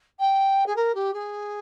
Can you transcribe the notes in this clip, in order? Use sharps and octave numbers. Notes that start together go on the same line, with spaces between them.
G5
G#4
A#4
G4
G#4